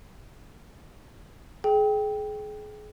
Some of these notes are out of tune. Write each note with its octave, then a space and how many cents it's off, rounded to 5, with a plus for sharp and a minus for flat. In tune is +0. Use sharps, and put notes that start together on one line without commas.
G#4 +30 G5 +0